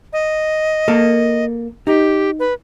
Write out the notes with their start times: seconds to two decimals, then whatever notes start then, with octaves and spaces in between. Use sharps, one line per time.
0.13 D#5
0.88 A#3 A4 A#4
1.87 D#4 G4
2.39 B4